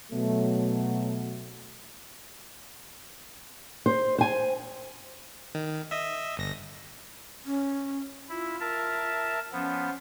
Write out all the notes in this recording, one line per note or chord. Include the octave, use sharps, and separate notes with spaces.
B2 F#3 A3
C5
C5 G#5
D#3
D#5 E5
G1 A#6
C#4
E4 F4
A#4 E5 A5
F3 B3 C#4